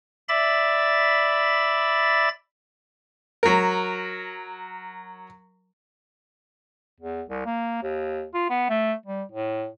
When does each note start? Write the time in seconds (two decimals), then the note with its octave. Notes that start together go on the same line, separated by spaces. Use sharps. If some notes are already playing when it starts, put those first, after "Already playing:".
0.29 D5 E5 B5 A6
3.43 F#3 A#4
7.00 E2
7.29 C2
7.46 A#3
7.83 D#2
8.34 F4
8.50 B3
8.69 A3
9.06 G3
9.31 A2